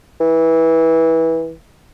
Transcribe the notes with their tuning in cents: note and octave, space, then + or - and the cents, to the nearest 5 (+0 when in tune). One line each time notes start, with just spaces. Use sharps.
E3 -20